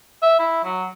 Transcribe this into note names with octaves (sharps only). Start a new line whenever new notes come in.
E5
E4
F#3